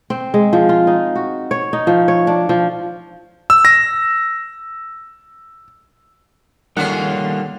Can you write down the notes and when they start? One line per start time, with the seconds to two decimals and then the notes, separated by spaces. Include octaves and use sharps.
0.10 C4
0.34 G#3
0.53 F3
0.69 F4
0.87 D#4
1.16 F#4
1.51 C#5
1.73 D#4
1.87 F3
2.08 C#5
2.27 D4
2.49 F3
3.50 E6
3.65 A#6
6.77 D3 D#3 G3 A#3 C#4 F4 G#4 F#5